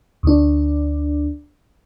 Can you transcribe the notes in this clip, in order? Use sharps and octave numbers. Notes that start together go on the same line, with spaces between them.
D2 D4